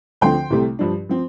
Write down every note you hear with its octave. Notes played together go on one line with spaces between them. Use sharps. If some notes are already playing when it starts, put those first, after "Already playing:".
D2 D3 F3 C4 G5 C6
C2 C3 A3
G2 F3 D4
F3 C4